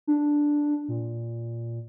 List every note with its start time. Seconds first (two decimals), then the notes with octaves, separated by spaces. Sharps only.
0.07 D4
0.88 A#2